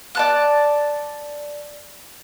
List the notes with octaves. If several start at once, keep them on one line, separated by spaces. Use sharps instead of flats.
D5 A5 F#6